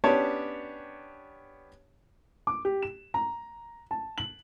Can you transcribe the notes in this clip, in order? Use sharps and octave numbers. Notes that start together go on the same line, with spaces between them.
B3 C#4 D4 G4 C#5 A5
D6
G4
E7
A#5
A5
F#7